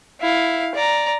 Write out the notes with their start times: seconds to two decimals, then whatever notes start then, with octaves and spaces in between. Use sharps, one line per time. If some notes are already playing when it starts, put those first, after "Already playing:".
0.21 E4 F5
0.75 D5 A#5